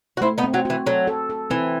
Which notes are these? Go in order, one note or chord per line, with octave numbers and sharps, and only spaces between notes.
F#4
A3 C4 E4
B3 D#4
C4
F#3
E3 F#4
F#3 A4
A4
A4
E3 C4